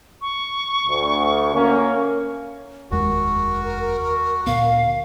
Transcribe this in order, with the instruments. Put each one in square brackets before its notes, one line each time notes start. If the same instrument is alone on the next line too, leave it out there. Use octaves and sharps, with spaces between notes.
[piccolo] C#6
[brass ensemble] D2
A#3 C#4
[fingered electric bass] F1 D#2 G#3 [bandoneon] F#4 [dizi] A#4
[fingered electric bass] D2 A#2 B3 [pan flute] F5